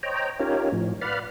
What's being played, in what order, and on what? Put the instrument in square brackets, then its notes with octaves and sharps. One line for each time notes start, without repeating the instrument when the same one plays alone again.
[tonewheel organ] C5 C#5 D#5 G5 A#5
C#4 D#4 F4 G4 A#4 C#5
A2 F3
B4 D5 F5 F#5 B5 F6